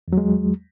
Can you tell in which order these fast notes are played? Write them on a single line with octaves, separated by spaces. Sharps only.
E2 F#3 G#3